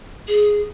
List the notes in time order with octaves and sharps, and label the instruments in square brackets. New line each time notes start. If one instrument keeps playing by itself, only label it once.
[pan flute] G#4